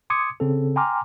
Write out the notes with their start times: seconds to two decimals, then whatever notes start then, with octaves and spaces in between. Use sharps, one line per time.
0.10 C6 D6 D#6 G#6 C#7
0.40 C#3 C4 A4
0.76 G5 G#5 A#5 C6 D6 F6